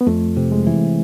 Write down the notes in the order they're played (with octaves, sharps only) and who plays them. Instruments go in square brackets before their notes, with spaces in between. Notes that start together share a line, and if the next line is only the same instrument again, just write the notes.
[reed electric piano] B3
[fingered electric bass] F2 [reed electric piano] A3
[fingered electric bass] C3
[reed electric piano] G#3
[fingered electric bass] E3